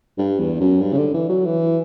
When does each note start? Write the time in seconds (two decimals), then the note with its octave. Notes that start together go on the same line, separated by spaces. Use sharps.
0.18 G2
0.39 E2
0.60 F#2
0.81 G2
0.93 C#3
0.98 D3
1.14 E3
1.29 F#3
1.45 E3